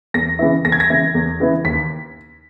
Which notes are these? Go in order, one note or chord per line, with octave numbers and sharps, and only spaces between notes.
E2 A#6
C#3 E3 B3 E4
E2 A#6
G#6
A#6
C#3 E3 B3 E4
E2
C#3 E3 B3 E4
D#2 B6